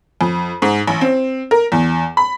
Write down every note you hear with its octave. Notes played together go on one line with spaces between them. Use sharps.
F2
G#2
A1
C4
A#4
E2
B5